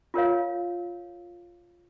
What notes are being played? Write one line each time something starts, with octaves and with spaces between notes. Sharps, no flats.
F4 A#4 C#5 F5